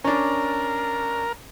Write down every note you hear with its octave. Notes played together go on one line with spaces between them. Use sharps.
C#4 D4 A#4